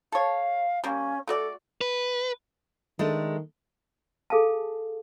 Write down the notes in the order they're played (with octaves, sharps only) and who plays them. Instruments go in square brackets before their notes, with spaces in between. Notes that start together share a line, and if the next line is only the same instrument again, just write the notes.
[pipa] A4 C#5 [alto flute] F5
[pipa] G3 A#3 [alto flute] C#4
[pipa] A3 F#4 D5 [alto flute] A4
[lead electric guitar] B4
[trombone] D#3 [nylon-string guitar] G#3 A3 D4
[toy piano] G#4 A4 F5 G#5 A5